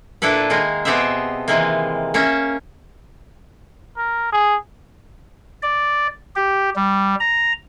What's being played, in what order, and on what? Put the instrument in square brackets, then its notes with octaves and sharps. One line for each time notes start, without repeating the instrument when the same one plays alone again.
[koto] A#2 D4 E4 A4 B4
D#3 G#3 A#3 A#4
B2 B3 C4 G4 G#4 E5
C3 D#3 E3 G#3 A#3
A#3 C#4 A#4 E5
[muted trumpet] A#4
G#4
[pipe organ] D5
G4
G3
A#5